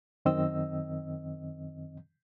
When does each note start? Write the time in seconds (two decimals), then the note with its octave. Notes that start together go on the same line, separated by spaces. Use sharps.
0.25 F#2 D#3 C4 D#5 E6